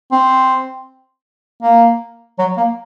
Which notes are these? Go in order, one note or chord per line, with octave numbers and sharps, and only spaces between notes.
C4
A#3
F#3
A#3